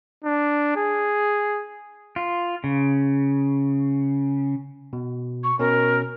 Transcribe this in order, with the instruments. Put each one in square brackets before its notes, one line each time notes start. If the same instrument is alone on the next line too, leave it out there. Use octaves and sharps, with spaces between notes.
[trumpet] D4
G#4
[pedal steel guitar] F4
C#3
[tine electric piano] B2
[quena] C#6
[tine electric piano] B2 C#4 [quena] A#4